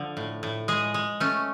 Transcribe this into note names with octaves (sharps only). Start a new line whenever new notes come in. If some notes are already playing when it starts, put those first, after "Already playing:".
Already playing: D3 F3
A2
A2
G#3 G#4
G#3
A3 C#4